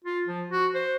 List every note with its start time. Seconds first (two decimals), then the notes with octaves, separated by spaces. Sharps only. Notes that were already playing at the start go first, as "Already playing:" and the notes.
0.04 F4
0.27 F3
0.51 F#4
0.74 C5